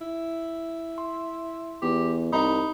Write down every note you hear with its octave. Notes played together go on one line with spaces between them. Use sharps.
E4
C6
E2 G4
C2 D#4 B5